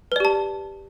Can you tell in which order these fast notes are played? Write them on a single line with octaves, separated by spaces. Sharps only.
B4 D5 G4 A5